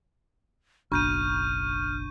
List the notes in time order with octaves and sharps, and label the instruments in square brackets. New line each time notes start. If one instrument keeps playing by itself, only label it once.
[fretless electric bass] F#1 B1 [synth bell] D4 [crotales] C#6 G6 D#7 [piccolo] F6